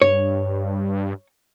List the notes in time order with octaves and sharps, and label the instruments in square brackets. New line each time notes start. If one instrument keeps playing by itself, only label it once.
[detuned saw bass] G2 [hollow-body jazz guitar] C#5